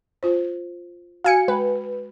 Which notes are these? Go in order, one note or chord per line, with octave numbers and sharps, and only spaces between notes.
F4 C5
F#4 F5 G#5 C#7
G#3 B4